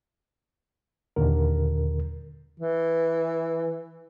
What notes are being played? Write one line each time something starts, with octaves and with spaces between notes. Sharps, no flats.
D#2 A#2 D3 A#4
E3